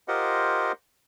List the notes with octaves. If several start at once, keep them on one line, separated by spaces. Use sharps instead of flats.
F4 G4 A#4 C5 D#5 F#5